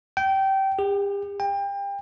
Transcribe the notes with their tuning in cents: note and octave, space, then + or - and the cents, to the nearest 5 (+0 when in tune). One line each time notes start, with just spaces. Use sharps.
G5 -20
G4 +40
G5 +30